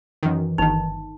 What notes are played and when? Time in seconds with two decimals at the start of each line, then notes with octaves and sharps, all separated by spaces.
0.23 F#2 D#3 E3
0.58 G1 D#3 D#4